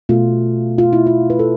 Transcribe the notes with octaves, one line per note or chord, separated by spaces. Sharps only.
B2 A3 F4
F4
E4
F4
B4
A4